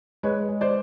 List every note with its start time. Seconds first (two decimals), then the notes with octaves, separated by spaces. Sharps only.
0.23 G#3 B4 C#5
0.48 G#3
0.61 C5 D5